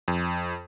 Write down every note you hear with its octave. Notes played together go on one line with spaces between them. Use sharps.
F2